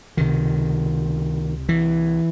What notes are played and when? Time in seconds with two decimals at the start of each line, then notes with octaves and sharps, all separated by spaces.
0.17 C#2 C3 D#3
1.69 E3